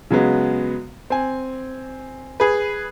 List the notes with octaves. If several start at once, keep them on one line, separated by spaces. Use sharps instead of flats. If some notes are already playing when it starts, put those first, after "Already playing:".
C#3 F#3 G#3 B3
C4 G#5
G#4 B4